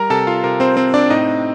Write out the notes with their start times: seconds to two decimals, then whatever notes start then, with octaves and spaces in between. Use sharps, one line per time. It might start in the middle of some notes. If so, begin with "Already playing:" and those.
Already playing: G3 A#4 A#5
0.10 C3 A4 A5
0.27 F4 F5
0.44 C3 A#4
0.60 C4 C5
0.77 C4 C5
0.94 D4 D5
1.10 A2 D#4 D#5